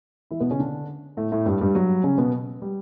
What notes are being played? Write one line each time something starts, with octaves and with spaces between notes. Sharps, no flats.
E3 E4
B2 B3
C#3 C#4
D3 D4
A2 A3
A2 A3
G2 G3
G2 G3
F#3
C#3 C#4
B2 B3
G3